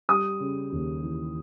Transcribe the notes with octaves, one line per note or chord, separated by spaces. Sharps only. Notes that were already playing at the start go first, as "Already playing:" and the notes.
G3 D#6
C#3
D#2
E3